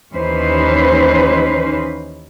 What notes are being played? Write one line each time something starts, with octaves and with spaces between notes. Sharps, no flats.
D#2 E3 C#4 D#4 B4 C5